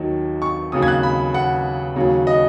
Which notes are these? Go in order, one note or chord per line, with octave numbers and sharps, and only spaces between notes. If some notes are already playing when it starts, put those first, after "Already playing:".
Already playing: D#2 D#3 F#3
C#6
D#2 C#3 F#3 D#6
G#6
F#6
B5
F#5
D#2 C#3 F#3
D#5